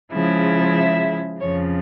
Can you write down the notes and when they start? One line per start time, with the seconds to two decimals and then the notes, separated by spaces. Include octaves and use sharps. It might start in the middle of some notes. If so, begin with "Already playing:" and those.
0.12 C#3 F3 G#3 E4
0.76 E5
1.40 F2 C#3 F3 C#5